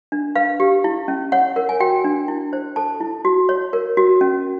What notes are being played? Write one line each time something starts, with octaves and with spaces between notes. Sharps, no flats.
D4
B4 F5
G4
E4
C#4
C#5 F#5
A#4
G#5
F#4 G5
D4
E4
C5
A4 A5
E4
F#4
C#5
A#4
F#4
C#4